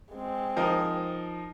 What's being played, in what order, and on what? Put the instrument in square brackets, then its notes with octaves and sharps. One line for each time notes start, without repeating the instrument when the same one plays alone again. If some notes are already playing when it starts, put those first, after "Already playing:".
[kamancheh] G#3 C4
[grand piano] F3 D#4 A#4